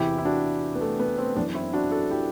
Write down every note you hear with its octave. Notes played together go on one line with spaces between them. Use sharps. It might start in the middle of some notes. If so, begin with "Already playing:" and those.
Already playing: E2 C3 E3 E4 G4
E4
D4 F#4
B3
A3
B3
A3 C4
F#2 E3 B3 D4
C4 E4
D4 F#4
F#4 A4
E4 G4